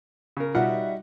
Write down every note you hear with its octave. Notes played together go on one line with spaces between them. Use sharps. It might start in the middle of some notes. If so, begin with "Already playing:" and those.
C#3 A#4
B2 G3 D#4 F4 F#4 E5 F#5